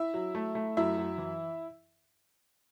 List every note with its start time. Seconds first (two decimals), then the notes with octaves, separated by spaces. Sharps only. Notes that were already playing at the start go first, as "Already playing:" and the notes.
Already playing: E4 E5
0.14 F#3
0.35 A3
0.55 A3
0.77 F#2 E4 E5
0.98 F#2
1.18 E3